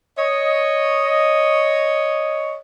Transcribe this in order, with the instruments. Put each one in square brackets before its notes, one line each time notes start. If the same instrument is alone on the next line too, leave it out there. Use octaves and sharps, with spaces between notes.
[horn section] C#5 D#5